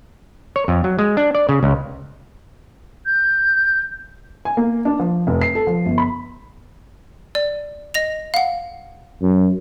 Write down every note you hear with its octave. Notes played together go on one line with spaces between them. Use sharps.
C#5
F2
F#3
G#3
D4
D5
C#3
C#2
G6
G#5
A#3
D4
F3
F1
C7
A4
F3
G1
B5
D5
D#5 A#6 F7
F5 F#5
F#2